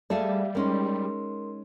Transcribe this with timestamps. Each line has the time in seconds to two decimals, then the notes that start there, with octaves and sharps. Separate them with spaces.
0.10 G3 A3 G#4 A4 D5 E5 F5
0.55 G#3 C#4 D#4 A#4 C6